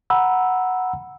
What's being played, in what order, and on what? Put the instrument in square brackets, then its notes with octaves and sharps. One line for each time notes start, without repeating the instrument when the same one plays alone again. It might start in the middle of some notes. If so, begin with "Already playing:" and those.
[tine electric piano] F#5 A#5 B5 E6